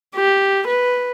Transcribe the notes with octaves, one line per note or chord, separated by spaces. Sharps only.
G4
B4